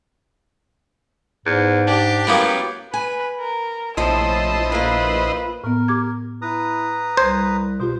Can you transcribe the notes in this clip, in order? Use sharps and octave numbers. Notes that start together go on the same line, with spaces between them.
E2 G#2
D4 G4
F#2 A2 A#3 B3
B4 G#5
A#4
A#1 A2 C3 F3 E4 C5 D#5 A5
A#3 F4 B4
A2 B3 A#4
G4 D6 G#6
E4 B4 A#5 D#6
C2 C5 G#6
B2 F4 G4 C5